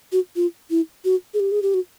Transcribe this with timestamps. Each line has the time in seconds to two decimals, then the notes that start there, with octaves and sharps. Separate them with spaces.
0.12 F#4
0.36 F4
0.70 E4
1.05 F#4
1.34 G#4
1.40 G4
1.52 G#4
1.62 G4
1.74 F#4